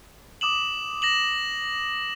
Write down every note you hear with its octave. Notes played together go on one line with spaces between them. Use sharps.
D6 D#6 E7 F#7
A#6 E7 F#7